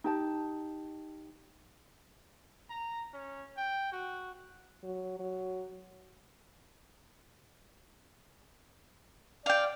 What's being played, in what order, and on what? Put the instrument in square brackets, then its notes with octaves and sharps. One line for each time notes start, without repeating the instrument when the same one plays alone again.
[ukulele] D#4 G4 A5
[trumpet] A#5
C#4
G5
F#4
[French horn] F#3
F#3
[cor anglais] D5 [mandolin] F5 G5